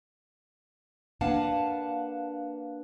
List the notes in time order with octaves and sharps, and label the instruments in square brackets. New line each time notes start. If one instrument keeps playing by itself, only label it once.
[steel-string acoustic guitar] A#3 D4 B4 F5 F#5 A5